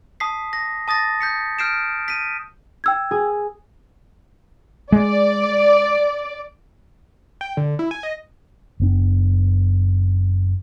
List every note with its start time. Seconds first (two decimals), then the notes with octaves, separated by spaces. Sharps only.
0.20 A5 D#6 B6 C7
0.53 A#6
0.88 A5 D#6 A6 A#6
1.21 G6 B6 C#7
1.59 F6 G6 C7 D7 E7
2.08 B6 D#7
2.84 G5 E6 G#6
3.11 G#4
4.92 G#3 D5
7.41 G5
7.57 D3
7.79 E4
7.91 G#5
8.03 D#5
8.80 F#1 B3 D4